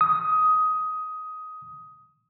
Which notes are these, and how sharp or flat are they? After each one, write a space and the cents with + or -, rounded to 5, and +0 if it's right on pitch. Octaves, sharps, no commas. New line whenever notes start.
D#6 +15